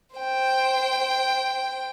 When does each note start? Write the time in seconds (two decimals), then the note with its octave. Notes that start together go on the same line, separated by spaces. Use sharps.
0.16 C5 G5